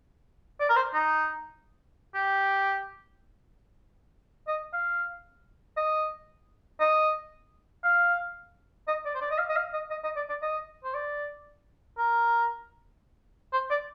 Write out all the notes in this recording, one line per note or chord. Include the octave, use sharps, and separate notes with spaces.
D5
A#4
C5
D#4
G4
D#5
F5
D#5
D#5
F5
D#5
D5
C5
D5
D#5
F5
D#5
F5
D#5
D#5
D#5
D5
D5
D#5
C5
D5
A#4
C5
D5